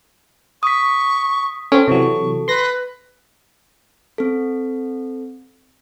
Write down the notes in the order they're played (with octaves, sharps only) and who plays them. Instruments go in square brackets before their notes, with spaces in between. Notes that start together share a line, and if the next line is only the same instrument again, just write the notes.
[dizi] C#6 [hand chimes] D#6 B6
[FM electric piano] C4 C#4 [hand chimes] A4
[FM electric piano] C3 E3 F#3 [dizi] C#6
[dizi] B4 [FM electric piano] C6 A#6
[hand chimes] C4 A4